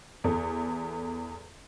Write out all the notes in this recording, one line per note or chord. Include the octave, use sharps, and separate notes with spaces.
E2 A4